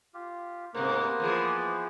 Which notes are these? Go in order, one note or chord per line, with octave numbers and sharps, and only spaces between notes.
F4 G4
G#2 C3 A#3 B3 B4 C5
E3 F3 G#4